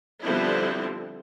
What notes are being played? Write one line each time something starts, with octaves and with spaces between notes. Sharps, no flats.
D3 F3 G3 B3 C4 E4